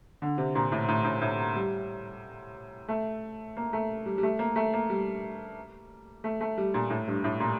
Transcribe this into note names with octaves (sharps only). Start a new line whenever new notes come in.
D3
C3
A#2
A2
A2
A2
A2
G3
A3
A#3
A3
G3
G3
A3
A#3
A3
A#3
G3
A3
A3
G3
A#2
A2
G2
A2
A#2